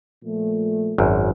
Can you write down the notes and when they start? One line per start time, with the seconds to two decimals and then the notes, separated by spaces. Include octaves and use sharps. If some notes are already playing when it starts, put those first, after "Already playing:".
0.24 A#2 F3 A3
0.98 G#1 F#2